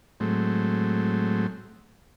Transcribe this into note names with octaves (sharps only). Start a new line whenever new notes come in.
A2 F#3 G#3 A3 C4